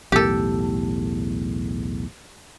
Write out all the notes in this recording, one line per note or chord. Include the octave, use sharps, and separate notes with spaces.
B1 E2 A2 G4 A4